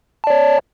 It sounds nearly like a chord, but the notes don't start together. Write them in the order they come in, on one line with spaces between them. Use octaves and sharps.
A5 D5 C#5